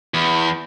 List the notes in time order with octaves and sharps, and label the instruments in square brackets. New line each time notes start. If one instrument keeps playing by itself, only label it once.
[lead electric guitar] E2